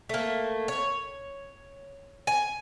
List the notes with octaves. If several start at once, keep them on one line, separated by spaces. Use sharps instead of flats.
A3 A#3
C#5
G#5